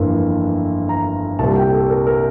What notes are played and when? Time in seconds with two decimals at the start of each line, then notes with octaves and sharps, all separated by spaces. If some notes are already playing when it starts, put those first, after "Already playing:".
Already playing: G1 F2 E3 A#3
0.89 A#5
1.39 C2 A#2 G3 C4 A5
1.56 G5
1.72 A4
1.90 A#4
2.07 A#4